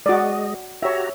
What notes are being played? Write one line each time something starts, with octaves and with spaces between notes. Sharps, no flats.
G#3 F#4 D5 D#5
F#4 G4 C#5 E5 A#5